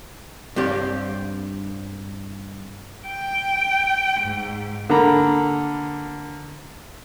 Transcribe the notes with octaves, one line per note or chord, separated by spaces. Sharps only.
G2 C4 G4 D5 F5
G5
G#2
D3 A#3 A#5 B5